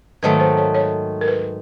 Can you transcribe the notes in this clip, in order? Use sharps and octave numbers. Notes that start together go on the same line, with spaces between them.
G#2 D#3 F#3 A3 B4
C5
C#5
C#5
A#4
B4